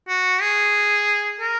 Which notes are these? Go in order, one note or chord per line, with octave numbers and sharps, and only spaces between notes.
F#4
G#4
A#4